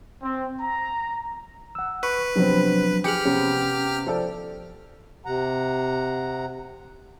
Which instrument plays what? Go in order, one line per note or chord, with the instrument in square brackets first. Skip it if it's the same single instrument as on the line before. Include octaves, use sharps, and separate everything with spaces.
[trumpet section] C4
A#5
[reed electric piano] F#5 E6
[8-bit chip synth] B4 [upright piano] C#6
[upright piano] C3 B3 C4 [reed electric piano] F3 F#3 D4
[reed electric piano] F3 [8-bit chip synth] G4 F6 [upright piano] G#4 C#7 F#7
[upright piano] C3 B3 [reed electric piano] C#4
[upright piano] F3 A4 D5
[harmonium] C3 F#5 A#5